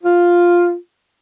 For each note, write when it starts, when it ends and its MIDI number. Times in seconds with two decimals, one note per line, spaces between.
0.04 0.74 65